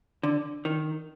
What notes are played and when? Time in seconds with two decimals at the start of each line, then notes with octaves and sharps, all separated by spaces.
0.23 D3
0.65 D#3